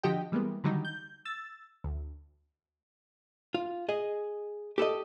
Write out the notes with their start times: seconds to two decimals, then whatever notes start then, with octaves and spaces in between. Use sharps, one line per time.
0.03 D3 F3 F#4 G4 D#5 G5
0.32 E3 G3 G#3 A#3 B3
0.64 D3 D#3 F#3 G3 D#4
0.85 G6
1.25 E6 A6
1.84 D2
3.54 F4
3.89 G#4 D#5
4.78 G4 A4 B4 D#5